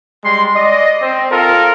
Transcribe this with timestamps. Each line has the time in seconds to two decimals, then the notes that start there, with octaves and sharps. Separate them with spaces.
0.23 G3 G#3 C6
0.55 D5 D#5
1.01 C4
1.31 F4 A4 A#4